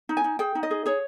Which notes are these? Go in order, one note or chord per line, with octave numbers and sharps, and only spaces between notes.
D#4
G#5
D#4
G#4 G5
D#4
D#5
G#4
G#4 C#5